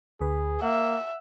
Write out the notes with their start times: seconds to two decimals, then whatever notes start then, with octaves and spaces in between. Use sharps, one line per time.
0.21 D2 G#4 B4
0.62 A#3 E5 F#5